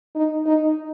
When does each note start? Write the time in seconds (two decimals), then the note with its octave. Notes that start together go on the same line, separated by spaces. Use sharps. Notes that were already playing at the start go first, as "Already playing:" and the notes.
0.16 D#4
0.46 D#4